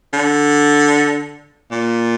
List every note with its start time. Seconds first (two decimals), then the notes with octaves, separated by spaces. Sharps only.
0.13 D3
1.71 A#2